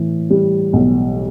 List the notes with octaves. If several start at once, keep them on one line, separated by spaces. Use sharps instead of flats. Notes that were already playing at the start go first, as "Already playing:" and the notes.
Already playing: A2 E3
G3
B1